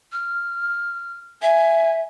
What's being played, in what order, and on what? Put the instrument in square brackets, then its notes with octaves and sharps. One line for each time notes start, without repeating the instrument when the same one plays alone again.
[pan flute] F6
[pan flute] E5 [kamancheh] G#5